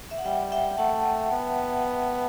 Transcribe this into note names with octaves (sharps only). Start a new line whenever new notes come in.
E5
F#5
G3 E5 G5
E5 G5
A3 F#5 A5
B3